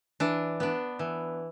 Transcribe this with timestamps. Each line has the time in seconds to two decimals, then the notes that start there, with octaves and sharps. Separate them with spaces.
0.20 E3 D4
0.60 B3 D4
0.99 E3